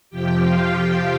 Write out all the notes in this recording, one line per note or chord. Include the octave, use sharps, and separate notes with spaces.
F2 C3 F3 G4 G5
F4 F5
F4 F5